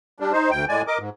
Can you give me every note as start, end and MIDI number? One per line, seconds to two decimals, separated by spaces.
0.20 0.32 55
0.20 0.32 62
0.32 0.50 63
0.32 0.50 72
0.51 0.65 38
0.51 0.65 79
0.69 0.82 45
0.69 0.82 56
0.69 0.82 74
0.69 0.82 80
0.87 0.98 70
0.87 0.98 75
0.87 0.98 86
0.99 1.09 44